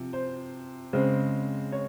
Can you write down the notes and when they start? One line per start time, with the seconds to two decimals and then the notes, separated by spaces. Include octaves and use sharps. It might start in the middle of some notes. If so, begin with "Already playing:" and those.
Already playing: C3 F3
0.13 C5
0.93 C#3 G#3 C4
1.72 C#5